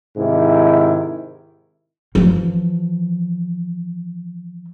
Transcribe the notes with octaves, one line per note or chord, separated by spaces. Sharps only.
G#2 C3 D#3 E4
E3 F3